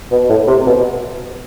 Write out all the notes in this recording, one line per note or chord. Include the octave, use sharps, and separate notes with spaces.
B2
A2
C3
B2